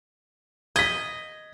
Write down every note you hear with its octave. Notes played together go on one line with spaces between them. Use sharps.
D#5 G#6 B6